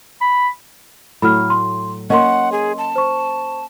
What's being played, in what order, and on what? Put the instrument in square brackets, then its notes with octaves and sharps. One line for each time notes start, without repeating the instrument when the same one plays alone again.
[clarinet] B5
[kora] A2 F#3 [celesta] B5 F6
[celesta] C6
[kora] A#3 C#4 [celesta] D#5 C6 [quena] F#5
[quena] G#4
A5
[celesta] C5 C#6